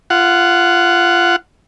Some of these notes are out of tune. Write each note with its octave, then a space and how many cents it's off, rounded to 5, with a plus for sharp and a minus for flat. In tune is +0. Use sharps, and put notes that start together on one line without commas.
F4 -20 F#5 +0